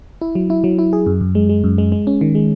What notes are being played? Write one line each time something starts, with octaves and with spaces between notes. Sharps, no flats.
E4
F#3
E4
F#3
E4
G#4
F#2
F#2
G#3
G#3
F#2
G#3
G#3
C#4
D#3
G#3